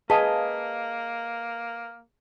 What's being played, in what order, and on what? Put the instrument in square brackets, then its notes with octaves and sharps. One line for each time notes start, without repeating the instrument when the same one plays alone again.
[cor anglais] A#3 [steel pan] G#4 [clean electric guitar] B4 D#5 F5 [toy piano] A5